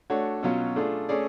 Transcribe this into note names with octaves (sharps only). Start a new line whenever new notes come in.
A3 D4 F#4 C#5
B2 F#3 C#4 F4
A3 D4 F4 G#4
A3 C#4 G#4 D5